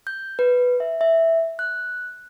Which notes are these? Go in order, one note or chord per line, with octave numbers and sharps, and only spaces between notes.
G6
B4
E5
E5
F#6